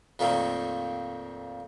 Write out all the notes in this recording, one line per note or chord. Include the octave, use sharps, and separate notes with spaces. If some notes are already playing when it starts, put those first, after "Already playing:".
F2 A#2 D#3 A3 A#3 C4